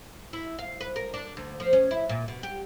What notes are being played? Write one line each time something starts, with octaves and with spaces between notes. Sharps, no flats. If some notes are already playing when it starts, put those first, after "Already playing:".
E4
F5
B4
A#4
D4
D2
F3
C#4
E4
A#2
B2
G4